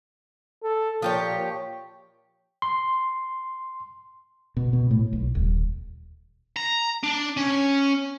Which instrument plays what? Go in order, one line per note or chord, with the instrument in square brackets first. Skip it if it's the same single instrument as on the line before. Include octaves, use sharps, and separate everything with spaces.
[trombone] A4
[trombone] A#2 [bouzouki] F3 G4 C#5
[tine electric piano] C6
[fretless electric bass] B2
B2
A2
B1
D#1
[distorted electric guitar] A#5
D4
C#4